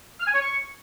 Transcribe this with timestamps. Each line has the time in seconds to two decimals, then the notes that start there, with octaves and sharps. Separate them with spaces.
0.20 F6
0.27 G#5
0.34 C#5
0.41 C#6